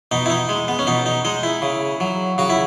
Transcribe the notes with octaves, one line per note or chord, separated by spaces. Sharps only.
B2 D#4
E4
D#4
G#3
B3
C#4
B2 D#4
D#4
G#3 D#4
E4
C#3
F#3
C#3 F#4
E4